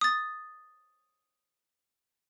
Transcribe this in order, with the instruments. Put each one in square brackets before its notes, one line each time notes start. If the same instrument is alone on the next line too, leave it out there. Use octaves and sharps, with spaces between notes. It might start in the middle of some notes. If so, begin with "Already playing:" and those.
[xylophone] D#6 A6